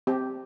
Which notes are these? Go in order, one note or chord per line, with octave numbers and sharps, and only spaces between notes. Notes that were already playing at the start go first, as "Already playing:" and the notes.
C4 G4